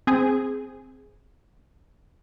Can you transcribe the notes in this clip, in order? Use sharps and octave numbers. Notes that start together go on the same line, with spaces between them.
C4 G#4